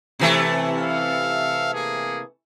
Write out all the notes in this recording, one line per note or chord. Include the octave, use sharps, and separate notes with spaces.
C3 E3 A3
E5 F5
A#3 G#4